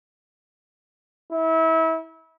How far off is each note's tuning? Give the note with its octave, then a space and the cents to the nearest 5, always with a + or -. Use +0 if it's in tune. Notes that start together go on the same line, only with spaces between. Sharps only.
E4 -30